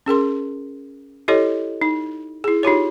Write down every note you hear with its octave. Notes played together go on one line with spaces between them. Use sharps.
C#4 G#4 A#4 C6
E4 G4 A4 C#5 D#5
D#4
E4 G#4
D#4 F4 G4 C#5